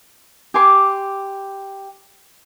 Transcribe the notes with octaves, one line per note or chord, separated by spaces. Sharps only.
G4 G#5 C6 D6